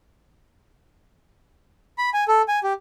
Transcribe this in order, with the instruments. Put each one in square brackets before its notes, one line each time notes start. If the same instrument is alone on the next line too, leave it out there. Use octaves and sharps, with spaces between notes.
[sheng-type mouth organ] B5
G#5
A4
G#5
G4